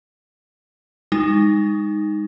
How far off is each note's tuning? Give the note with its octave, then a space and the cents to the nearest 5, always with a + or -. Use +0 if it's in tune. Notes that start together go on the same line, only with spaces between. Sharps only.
G#3 -35 D#4 +0